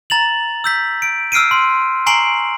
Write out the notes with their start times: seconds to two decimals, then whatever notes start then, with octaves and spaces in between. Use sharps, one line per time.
0.10 A#5 A6 F7 F#7
0.64 E6 G6 B6
1.02 D7
1.32 E6 F6 C7 D7 D#7
1.51 C6
2.06 G#5 A#5 C#6 C7 D7 F#7